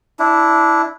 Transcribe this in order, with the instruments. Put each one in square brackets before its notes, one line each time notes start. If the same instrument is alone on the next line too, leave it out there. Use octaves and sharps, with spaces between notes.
[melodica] D4 E4